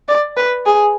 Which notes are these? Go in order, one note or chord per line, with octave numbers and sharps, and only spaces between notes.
D5
B4
G#4